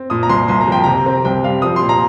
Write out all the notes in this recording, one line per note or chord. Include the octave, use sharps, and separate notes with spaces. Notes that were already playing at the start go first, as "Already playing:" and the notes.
Already playing: C4
A#2 D#6
A#5
C2 C6
C2 C6
A#5
F3 G5
C3 A#5
C4
C2 G5
G3 F5
F3 D#6
C6
A#2
A#5